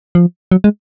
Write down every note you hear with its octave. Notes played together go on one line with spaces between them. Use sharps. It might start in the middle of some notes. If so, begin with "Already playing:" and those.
F3
F#3
G#3